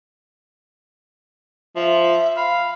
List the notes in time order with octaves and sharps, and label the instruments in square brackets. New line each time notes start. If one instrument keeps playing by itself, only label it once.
[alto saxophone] F3 [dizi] E5
[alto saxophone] F5 [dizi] B5